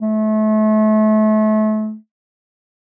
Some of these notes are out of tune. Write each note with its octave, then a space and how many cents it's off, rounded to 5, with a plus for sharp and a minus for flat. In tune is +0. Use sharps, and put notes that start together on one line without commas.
A3 -35